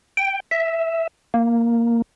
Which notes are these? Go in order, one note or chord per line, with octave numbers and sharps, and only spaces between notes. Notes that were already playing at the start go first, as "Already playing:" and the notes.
G5
E5
A#3